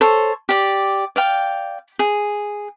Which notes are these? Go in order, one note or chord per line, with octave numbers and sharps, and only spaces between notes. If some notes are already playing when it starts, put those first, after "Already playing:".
A4 C5 C#5
G4 D5
D5 F5 G5
G#4